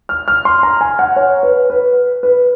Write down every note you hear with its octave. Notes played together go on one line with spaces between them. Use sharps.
F6
F6
C6
A#5
G#5
F#5
C#5
B4
B4
B4